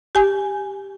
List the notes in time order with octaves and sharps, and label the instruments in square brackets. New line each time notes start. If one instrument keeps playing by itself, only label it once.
[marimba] G4 G#5